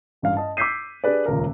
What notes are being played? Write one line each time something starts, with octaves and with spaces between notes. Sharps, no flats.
A1 G2 F5
D#5 A5
D6 E6 G6 B6 C7 D#7
D4 G4 G#4 B4 D5
D#1 C#2 A#4